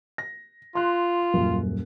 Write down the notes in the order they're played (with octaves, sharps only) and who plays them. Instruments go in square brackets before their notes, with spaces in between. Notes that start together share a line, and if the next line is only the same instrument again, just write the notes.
[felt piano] A#6
[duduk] F4 [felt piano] C6 F#6
[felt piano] D#1 F#2